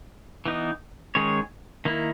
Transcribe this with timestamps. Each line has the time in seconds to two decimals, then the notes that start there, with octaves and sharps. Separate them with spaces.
0.46 E3 B3 D#4
1.15 D#3 G#3 C#4 G#4 C#5
1.85 D#3 A#3 E4